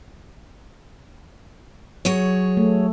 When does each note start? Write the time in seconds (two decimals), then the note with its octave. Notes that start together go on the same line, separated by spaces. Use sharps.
2.05 F#3 G#4 C#5
2.57 A3